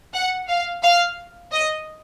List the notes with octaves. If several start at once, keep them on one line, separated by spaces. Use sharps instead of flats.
F#5
F5
F5
D#5